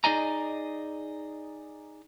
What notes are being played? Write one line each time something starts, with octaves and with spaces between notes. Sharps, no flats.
D#4 G#4 D5 D#5 G#5 A#5